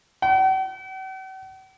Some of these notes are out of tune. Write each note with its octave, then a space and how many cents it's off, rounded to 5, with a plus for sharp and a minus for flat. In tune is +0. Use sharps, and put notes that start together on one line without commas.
F#5 +45